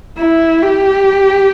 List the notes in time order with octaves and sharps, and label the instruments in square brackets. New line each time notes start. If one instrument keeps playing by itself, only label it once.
[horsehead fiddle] E4
G4